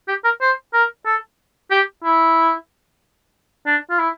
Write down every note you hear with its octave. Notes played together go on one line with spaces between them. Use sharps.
G4
A#4
C5
A#4
A4
G4
E4
D4
F4
E4